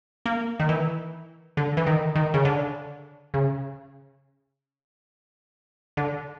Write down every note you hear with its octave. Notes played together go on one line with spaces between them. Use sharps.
A#3
D#3
E3
D3
E3
D#3
D#3
C#3
D3
C#3
D3